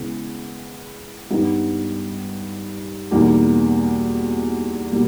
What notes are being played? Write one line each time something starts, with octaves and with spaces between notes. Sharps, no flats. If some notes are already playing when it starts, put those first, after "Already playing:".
Already playing: C#3 G#3 B3 E4
G2 G3 B3 D#4
E2 B2 G3 A#3 D#4
B2 G3 A#3